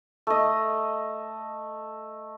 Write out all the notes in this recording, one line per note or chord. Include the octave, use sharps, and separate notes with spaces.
A3 D#5